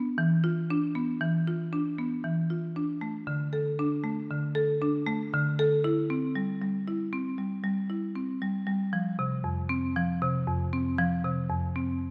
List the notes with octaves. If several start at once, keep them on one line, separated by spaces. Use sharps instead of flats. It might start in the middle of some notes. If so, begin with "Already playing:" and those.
Already playing: B3 D4
E3
F4
D4
B3
E3
F4
D4
B3
E3
F4
D4
A3
D3
A4
D4
A3
D3
A4
D4
A3
D3
A4
E4
C4
G3
G3
E4
C4
G3
G3
E4
C4
G3
G3
F3
C3
F2
C4
F3
C3
F2
C4
F3
C3
F2
C4